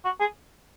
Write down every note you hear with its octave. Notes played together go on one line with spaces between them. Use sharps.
F#4
G#4